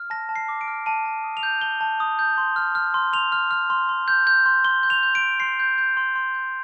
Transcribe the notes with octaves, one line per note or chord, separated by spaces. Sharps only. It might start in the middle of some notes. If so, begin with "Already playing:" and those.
Already playing: F6
A5 A#6
A5
C7
D6
D7
F6
A5 D#7
A5
D#6
F7
G6
A5 G7
A5
D#6
G6
C6
F6
F6
C6
C6 F7
F6
F6
C6
C6
G6
G6
C6
C6 G7
G6
F7
G6
D7
C6
C6 C7
G6
G6
C6
C6
G6